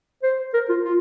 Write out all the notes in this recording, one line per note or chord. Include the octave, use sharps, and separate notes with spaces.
C5
A#4
F4
F4